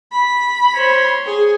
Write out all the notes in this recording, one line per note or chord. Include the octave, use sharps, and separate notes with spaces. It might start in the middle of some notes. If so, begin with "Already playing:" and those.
B5
C5 C#5
G#4